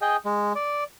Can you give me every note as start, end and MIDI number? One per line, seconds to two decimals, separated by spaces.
0.01 0.17 68
0.01 0.17 75
0.01 0.17 79
0.25 0.53 56
0.55 0.84 74